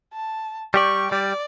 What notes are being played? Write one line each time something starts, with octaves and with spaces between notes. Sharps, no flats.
A5
G3 G4 D5 C#6
G3 D5